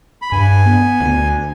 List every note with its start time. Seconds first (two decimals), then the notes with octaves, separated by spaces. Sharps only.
0.22 B5
0.32 G2 G#5
0.66 B3
1.00 D2